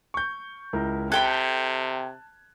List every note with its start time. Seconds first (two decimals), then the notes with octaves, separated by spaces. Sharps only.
0.14 C#6 G6
0.73 C#2 E4 A#4
1.12 C3 A4 G5 A5 B5 F#6 G#6